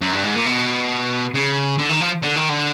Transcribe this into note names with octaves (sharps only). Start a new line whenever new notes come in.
F#2
G2
G#2
A#2
B2
C#3
D3
D#3
F3
D3
D#3
D3